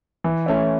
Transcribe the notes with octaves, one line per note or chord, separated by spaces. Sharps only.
E3
A3 C#4 E4